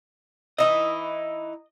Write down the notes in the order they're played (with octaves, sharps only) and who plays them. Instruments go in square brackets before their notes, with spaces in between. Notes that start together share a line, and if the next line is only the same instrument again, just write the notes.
[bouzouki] E3 D#4 E4 [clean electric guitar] D#5